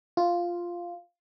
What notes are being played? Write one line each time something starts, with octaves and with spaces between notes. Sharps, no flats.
F4